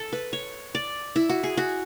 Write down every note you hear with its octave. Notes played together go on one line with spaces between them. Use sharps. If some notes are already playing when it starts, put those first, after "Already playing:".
Already playing: A4
B4
C#5
D5
E4
F#4
G#4
F#4